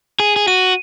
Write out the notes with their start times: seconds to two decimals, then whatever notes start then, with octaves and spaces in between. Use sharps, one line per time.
0.20 G#4 D#7
0.36 G#4
0.48 F#4 D#7